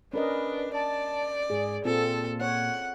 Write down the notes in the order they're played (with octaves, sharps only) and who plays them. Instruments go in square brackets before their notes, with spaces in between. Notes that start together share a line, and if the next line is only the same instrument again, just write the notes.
[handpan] C#4 A#4 D#5 [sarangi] D4 [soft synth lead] B4
[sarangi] D5 [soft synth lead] A5
[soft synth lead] G#2 [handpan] G#4
[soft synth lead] A#2 [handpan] C4 F4 [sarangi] A4
[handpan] C#5 [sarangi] F#5